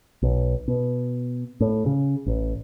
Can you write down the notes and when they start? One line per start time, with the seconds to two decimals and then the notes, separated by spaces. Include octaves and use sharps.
0.22 B1
0.68 B2
1.60 A2
1.86 C#3
2.26 A1